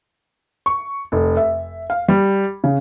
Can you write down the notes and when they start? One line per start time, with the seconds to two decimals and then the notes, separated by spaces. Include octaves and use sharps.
0.66 C#6
1.12 F1
1.37 E5
1.90 F5
2.09 G3
2.64 C#3